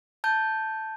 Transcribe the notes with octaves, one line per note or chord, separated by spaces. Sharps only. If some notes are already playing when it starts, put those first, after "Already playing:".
A5 G6